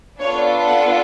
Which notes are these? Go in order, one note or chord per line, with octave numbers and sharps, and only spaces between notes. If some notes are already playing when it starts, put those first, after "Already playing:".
B3 D4 F4 A4 C#5
F#5